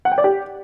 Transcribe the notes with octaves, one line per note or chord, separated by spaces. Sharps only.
F#5
G5
D5
G4